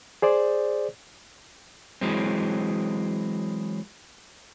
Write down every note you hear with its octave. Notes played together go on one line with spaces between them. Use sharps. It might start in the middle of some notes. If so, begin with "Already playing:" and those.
G#4 C5 D5
E3 F#3 G#3 C4